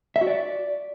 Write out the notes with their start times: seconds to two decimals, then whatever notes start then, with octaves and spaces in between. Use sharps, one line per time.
0.16 E5
0.21 F#4
0.27 D5